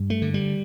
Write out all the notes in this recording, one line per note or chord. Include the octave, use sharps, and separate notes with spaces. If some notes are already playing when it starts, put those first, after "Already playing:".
Already playing: G2
A3
D3
G3